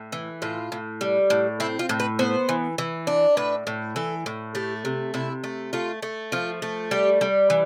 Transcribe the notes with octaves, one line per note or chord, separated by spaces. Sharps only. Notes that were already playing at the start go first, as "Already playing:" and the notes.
Already playing: A2
E3
A2 F4
A2
G3
A2
C4 E4
F4
A2
B4
B3 C5
E3
E3
D4
A2 B4
A2
E3 A4
A2
A3 G4
C3
C3 E4
A3
A3 F4
A3
F3 F4
A3
G3 G4
G3
E3